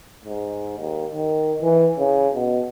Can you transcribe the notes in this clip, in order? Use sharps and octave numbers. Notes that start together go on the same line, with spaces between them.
G#2
D#2
D#3
E3
C#3
B2